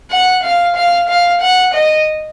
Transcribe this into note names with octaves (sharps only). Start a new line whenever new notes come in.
F#5
F5
F5
F5
F#5
D#5